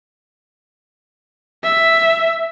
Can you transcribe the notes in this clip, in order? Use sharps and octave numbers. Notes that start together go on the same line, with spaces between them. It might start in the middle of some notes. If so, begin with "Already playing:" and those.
E5